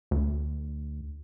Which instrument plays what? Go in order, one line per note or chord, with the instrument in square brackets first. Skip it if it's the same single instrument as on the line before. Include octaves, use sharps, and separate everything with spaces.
[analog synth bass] D2